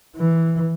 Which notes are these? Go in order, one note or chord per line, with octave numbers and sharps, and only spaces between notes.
E3